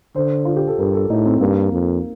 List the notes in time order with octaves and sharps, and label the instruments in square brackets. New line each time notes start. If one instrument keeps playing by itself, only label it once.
[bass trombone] D3 [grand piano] C5
[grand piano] F4
G4
A4
[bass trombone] G2 [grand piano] A#4
[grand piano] A4
[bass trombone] A2 [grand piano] D#4
[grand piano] C4
[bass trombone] G2 [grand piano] A#3
[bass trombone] F2